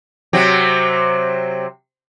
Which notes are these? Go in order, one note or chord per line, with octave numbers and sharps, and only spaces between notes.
C3 F#3 C4